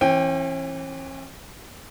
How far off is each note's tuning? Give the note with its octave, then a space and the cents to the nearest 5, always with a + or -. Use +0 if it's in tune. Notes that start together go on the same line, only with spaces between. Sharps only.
E3 +5 C#4 -45 G5 +0